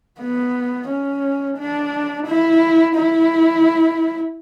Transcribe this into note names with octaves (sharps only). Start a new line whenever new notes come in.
B3
C#4
D4
E4
E4